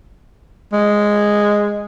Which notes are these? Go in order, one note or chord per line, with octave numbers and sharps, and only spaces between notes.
G#3